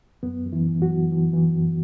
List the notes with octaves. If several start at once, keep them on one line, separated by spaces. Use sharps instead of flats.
F#2 B3
F#2
E3 E4
E3
F#3 F#4
E3
E3
E3
F#2